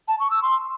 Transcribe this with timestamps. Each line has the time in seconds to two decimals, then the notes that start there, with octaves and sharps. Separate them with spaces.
0.08 A5
0.19 C#6
0.30 E6
0.42 C6